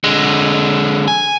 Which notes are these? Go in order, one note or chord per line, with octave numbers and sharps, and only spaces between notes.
D3 G#3
G#5